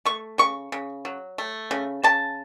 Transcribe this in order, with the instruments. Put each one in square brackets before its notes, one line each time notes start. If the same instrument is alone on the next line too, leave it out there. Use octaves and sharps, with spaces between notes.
[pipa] A3 C#6
C#3 C#6
C#3
F#3
A3
C#3
C#3 A5